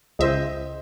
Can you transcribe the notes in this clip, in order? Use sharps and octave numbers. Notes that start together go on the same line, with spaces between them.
C#2 C5 D#5 E5